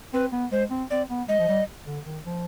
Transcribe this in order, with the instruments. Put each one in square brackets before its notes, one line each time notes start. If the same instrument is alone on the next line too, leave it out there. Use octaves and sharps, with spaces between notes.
[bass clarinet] C4 [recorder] B4
[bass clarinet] B3
[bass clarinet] G#3 [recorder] C5
[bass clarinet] C4
[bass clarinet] C4 [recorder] D5
[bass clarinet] B3
[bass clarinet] G#3 [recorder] D#5
[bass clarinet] F3
G3
D3
D#3
F3